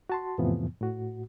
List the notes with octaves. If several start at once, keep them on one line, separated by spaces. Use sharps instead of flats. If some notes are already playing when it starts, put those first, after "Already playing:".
F#4 A5 C6
F2 A2 C3 E3 F3 B3
A2 F#4